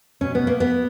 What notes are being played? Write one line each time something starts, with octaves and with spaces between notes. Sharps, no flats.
B2 C#4
B3
A#3
B3